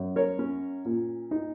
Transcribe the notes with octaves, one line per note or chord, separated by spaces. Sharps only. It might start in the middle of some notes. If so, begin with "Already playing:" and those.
Already playing: F#2
A#4 C#5
C#4
A#2
D#4